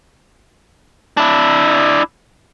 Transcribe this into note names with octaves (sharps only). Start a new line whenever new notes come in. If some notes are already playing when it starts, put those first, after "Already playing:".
D4 E4